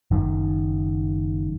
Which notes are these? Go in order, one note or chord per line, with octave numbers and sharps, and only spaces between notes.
F#1 F#2 D#3